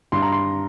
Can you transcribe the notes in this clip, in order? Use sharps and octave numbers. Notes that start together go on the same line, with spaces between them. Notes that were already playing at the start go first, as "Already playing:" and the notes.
G2 C6
A#5
C6